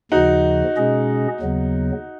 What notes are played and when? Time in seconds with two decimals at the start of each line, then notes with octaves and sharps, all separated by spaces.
0.11 D#2 C#3 F3 D#4 F#4
0.77 B2 G#3 C#4 G#4 D#5
1.40 D#2 C#3 F#3 B3